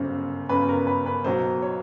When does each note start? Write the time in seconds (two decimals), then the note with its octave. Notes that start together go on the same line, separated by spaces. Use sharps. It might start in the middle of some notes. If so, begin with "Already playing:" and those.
Already playing: G1 F#2 C#3 C5
0.49 G1 F#2 C#3 B4
0.69 A#4
0.87 B4
1.06 B4
1.24 B1 B2 F#3 C5
1.62 C#5